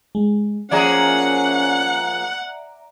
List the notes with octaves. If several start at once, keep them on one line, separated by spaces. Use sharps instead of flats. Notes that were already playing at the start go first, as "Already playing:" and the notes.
G#3
F3 A#3 C#4 G#4 D5 E5 F#5 A#5